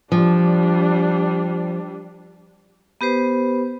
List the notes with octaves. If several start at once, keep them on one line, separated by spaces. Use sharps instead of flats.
F3 G3 D4
B3 G4 B4 C5